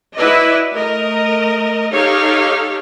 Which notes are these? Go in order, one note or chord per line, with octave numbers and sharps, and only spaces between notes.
E4 F#4 B4 D5 D#5
A3 A#4 D#5
D#4 G4 A4 C#5 F5